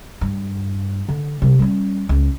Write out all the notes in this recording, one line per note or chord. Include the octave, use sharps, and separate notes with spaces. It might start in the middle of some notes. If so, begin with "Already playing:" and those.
G2
D3
C3 G3
G3 C#4
C#2